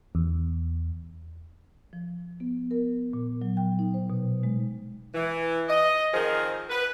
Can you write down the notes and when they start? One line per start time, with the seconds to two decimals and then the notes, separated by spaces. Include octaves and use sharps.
0.15 E2
1.93 F3
2.40 B3
2.71 A#4
3.13 A#2
3.42 F#3
3.57 G5
3.79 D#4
3.94 C5
4.10 B2
4.43 G#3
5.14 E3
5.69 D#5
6.13 D#3 F3 C4 G#4 A#4
6.70 B4